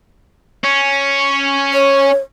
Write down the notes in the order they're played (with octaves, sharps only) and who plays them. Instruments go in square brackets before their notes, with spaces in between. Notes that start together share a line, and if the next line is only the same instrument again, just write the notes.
[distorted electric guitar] C#4
[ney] C#5